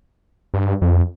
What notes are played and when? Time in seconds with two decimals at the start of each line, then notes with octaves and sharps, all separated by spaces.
0.54 G2
0.82 F2